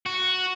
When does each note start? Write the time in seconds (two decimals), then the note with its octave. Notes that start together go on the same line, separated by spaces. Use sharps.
0.06 F#4